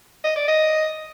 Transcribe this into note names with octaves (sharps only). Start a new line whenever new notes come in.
D#5
D5
D#5